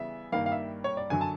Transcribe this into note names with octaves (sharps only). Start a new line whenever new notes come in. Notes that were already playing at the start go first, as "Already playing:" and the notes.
Already playing: C#3 E3 G3 B3 E5
G2 D#3 G3 A#3 F5
F5
E5
C#5
D5
F#2 D3 F#3 G#5
A5